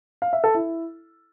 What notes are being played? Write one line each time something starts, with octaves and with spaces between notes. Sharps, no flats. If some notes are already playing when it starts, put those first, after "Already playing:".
F5
E5
A4
E4